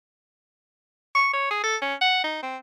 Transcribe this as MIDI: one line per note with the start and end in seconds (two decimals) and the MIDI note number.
1.15 1.28 85
1.33 1.48 73
1.51 1.62 68
1.63 1.76 69
1.82 1.94 61
2.01 2.23 78
2.24 2.39 63
2.43 2.57 60